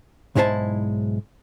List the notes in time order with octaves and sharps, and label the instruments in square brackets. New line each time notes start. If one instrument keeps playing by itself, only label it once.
[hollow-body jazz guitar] B1 G#2 G#3 E4 C5 A5